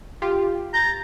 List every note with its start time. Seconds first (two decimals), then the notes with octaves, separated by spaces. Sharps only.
0.22 F4 G4
0.74 A#5 G6 A6